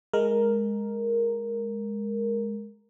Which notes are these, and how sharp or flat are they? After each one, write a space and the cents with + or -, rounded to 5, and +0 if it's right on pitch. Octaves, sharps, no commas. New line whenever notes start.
G#3 +0 A#4 +0